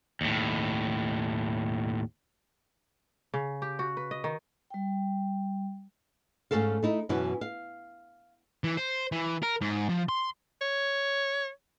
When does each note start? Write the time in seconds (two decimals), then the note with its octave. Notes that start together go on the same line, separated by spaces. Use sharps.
0.21 D#2 A2
3.34 C#3
3.62 G4
3.79 F#4
3.97 B4
4.11 D#5
4.24 D#3
4.70 G3 G5
6.51 G#2 A3 C#4 A4 F5
6.83 A3 D#4 E4
7.09 F#2 B2 E3 C#4 E4
7.41 F5
8.64 E3
8.77 C5
9.12 E3
9.43 A#4
9.61 G#2
9.89 F3
10.09 C6
10.61 C#5